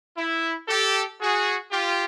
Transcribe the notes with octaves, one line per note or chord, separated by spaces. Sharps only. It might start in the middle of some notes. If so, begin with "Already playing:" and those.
E4
G4 A4
F#4 G#4
F4 G4